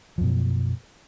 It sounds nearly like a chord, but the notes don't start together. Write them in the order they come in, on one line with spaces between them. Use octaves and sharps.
F3 F#2 B2